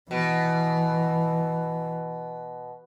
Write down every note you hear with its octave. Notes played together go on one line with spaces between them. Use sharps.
B2 E3